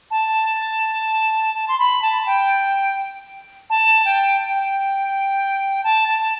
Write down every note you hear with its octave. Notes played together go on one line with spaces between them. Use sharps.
A5
A5
C6
B5
A5
G5
A5
G5
G5
A5
A5